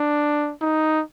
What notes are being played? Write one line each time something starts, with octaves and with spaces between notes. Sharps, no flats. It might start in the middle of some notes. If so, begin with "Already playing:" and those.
Already playing: D4
D#4